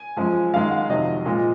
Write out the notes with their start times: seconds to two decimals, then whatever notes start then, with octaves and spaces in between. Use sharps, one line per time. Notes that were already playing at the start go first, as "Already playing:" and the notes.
Already playing: G#5
0.17 F#2 F3 G#3
0.54 F#2 D#3 G#3 F5
0.71 F#5
0.90 F2 C3 D#3 F#3 D#5
1.26 A#2 G#3